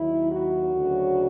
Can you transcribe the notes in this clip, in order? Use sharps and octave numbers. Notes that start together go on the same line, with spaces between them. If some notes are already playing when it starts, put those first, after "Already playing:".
Already playing: D#2 D#3 F#3 E4
F#4
D2 C#3 F#3